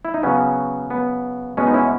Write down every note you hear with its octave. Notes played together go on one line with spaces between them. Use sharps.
E4
D#4
C#3 F#3 B3 C#4
B3
B2 G#3 B3 C#4
D#4
C#4 E4